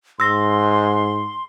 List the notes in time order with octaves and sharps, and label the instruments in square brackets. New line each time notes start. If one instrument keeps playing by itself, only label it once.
[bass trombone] G#2 [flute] C6 [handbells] E6 A#6